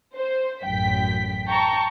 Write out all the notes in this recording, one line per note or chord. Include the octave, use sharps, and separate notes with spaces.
C5
A1 F#2 G5 B6
G5 A5 A#5 C#6